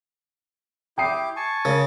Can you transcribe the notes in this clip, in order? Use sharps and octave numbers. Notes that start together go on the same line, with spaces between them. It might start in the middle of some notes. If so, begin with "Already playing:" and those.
E4 G4 G5 D6 D#6 C7
G#5 A5 C#6
C#3 A#4 C#5